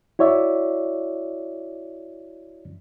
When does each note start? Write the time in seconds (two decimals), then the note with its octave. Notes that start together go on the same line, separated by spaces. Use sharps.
0.19 E4 F#4 C#5 D5 E5